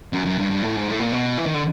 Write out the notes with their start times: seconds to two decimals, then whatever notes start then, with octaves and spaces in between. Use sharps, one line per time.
0.13 F#2
0.26 F#2
0.39 G2
0.50 G2
0.62 A2
0.76 G#2
0.88 A2
1.00 A#2
1.12 B2
1.38 E3
1.46 D#3
1.54 D3